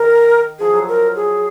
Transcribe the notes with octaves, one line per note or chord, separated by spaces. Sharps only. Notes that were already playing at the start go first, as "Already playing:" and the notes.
Already playing: D#3 A#4
F3 G#4
F#3
A#4
G#4